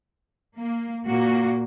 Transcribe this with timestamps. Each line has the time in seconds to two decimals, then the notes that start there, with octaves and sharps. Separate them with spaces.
0.57 A#3
1.06 A#2 A#3 F#4